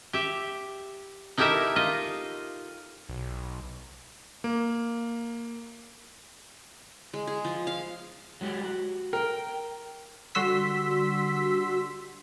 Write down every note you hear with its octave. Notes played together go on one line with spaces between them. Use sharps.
G4 E5
D#4 E4 G4 A4 A#4 E5
F4 D#5
B1
A#3
G#3
G#4
F3
F5
F#3 G#3 G4
F#4
A#4 G5
D3 G3 F#4 C6 E6 B6